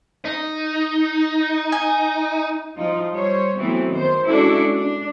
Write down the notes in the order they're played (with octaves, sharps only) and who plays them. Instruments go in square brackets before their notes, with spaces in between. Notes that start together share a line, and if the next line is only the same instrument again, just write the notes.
[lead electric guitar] D#4
[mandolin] G#5
[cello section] F3 D#4 F4
G3 C5 C#5
E3 F#3 A3 B3 C4
D#3 C5
G#3 C#4 D4 E4 F#4 A4
D4